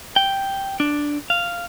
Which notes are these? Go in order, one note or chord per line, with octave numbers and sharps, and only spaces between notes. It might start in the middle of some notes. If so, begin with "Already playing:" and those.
G5
D4
F5